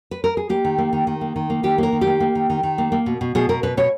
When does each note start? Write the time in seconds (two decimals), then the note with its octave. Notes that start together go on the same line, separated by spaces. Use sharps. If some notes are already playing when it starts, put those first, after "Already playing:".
0.11 B4
0.24 A#4
0.37 G#4
0.49 A#3 G4
0.65 D#3
0.78 A#3
0.93 D#3
1.07 D#3
1.21 A#3
1.36 D#3
1.50 A#3
1.63 D#3 G4
1.78 A#3 A#4
1.93 D#3
2.01 G4
2.07 A#3
2.20 A#3
2.35 D#3
2.50 D#3
2.63 D#3
2.78 A#3
2.92 A#3
3.06 B2
3.21 B2
3.35 B2 G#4
3.49 B2 A#4
3.63 B2 B4
3.77 B2 C#5